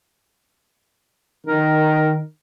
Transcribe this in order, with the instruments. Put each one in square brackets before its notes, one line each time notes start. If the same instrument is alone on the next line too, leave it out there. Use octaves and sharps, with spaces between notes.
[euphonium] D#3 [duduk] A#4